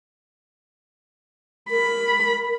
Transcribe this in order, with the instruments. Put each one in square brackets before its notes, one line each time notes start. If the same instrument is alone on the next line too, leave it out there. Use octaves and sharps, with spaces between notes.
[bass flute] A#4 [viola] B5